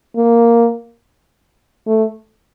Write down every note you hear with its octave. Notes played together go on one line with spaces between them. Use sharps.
A#3
A3